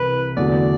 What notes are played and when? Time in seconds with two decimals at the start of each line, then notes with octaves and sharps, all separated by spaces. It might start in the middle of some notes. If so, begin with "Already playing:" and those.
Already playing: C2 C3 E3 B4
0.37 E2 D3 F#3 A3 D5